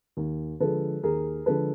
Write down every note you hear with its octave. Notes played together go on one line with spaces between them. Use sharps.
D#2
D3 F3 G#3 A4 B4
D#2 G#4 A#4
D3 F3 G#3 A4 B4